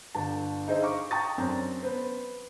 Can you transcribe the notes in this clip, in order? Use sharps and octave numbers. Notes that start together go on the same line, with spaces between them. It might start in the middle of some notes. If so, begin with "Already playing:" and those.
G1 D3 A5
D#4 G#4 C5 D#5 E5
F5 A#5 C#6 D6
G5 A5 A#5 C#6 D#6 A6
F#2 C4 D4 C#5 A#5
B3 C5